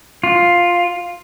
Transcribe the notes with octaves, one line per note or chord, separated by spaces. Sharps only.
F4